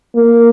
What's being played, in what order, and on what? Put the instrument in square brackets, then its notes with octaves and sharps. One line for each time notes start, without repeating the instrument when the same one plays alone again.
[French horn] A#3